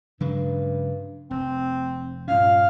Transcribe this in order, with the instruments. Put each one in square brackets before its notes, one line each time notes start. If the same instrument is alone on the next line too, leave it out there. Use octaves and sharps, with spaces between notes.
[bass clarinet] G2 [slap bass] C#3 F#3 G#3
[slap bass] F1 [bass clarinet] C4
[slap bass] G2 C#4 [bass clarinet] A#2 [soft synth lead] F5